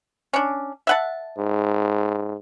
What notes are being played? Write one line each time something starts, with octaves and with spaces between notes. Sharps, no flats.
C#4 D4
E5 F#5 A5
G#2